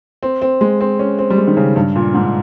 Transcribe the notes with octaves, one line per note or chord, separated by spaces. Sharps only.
C4
C4
G#3
C4
C#4
C4
G3
G#3
D#3
C#3
G2
A#2
G#2